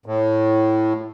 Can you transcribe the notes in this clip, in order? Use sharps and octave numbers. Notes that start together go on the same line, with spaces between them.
A2